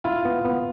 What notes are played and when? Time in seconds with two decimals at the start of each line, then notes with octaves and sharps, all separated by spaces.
0.04 E4 F4
0.25 B3
0.45 B3